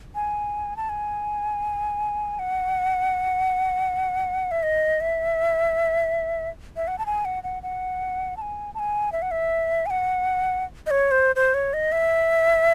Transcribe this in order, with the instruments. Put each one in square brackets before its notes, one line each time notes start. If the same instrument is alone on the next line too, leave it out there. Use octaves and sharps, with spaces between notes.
[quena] G#5
A5
G#5
F#5
E5
D#5
E5
E5
F#5
A5
G#5
F#5
F#5
F#5
A5
G#5
A5
G#5
E5
F#5
E5
G#5
F#5
D#5
C#5
C5
C5
C#5
D#5
E5